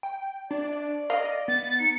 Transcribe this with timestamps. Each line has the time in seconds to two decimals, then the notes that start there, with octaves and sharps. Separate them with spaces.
0.03 G5
0.51 D4 D5
1.10 D#5 F5
1.48 B3 A6
1.79 D#4 C#7